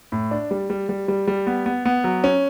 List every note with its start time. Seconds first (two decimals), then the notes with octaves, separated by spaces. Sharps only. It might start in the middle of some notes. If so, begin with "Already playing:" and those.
0.12 A2
0.31 D4
0.51 G3
0.70 G3
0.89 G3
1.08 G3
1.27 G3
1.47 B3
1.66 B3
1.85 B3
2.04 F#3
2.24 C#4